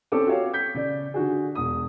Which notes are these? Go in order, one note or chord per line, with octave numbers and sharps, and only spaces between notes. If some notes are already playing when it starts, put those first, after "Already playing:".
C4 C#4 A4 D6
F#4 G4 C#5 F5
G6 B6
C#3 D5
D3 F#4 G#4
E1 D#6